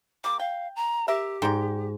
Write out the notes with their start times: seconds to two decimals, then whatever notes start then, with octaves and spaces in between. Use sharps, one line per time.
0.24 G3 A#3 D6
0.39 F5 G5
0.76 A#5
1.08 G4 A#4 E5
1.42 G#2 D#4 D5 G5